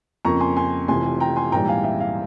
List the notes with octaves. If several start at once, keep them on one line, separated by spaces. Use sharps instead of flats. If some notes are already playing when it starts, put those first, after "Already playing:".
F2 C#3 F3 A#3 A#5 C#6
G#5 C6
G#5 C6
F1 F2 C3 E3 G#5 C6
G5 A#5
G#5 C6
A#1 G#2 E3 G3 G5 A#5
F5 G#5
E5 G5
F5